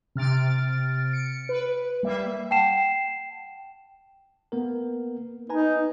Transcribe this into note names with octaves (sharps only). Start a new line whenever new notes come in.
C3 F6 A6 D7
C#7 D7
B4
G3 A#3 E5
F#5 G5 A5 C7 E7
A#3 B3 A#4
D#4 B4 G#5 A#5